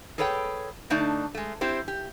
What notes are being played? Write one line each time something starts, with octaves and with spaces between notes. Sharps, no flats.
G#4 A4 B4 C#5 F5 G5
D3 A3 D4 D#4 D5 A5
G#3 A3
C4 E4 G4 C5
G4